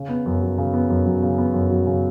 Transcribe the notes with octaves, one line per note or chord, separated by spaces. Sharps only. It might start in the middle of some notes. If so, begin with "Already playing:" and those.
Already playing: C#3
B3
F#2
F#3
C#3
B3
F#2
F#3
C#3
B3
F#2
F#3
C#3